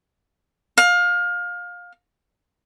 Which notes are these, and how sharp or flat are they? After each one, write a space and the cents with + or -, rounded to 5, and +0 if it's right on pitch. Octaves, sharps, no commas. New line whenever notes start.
F5 +25